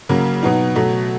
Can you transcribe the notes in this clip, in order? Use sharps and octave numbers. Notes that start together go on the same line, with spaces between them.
C#3 F#3 A#3
B2 F#3 B3 D#4
B2 F#3 A3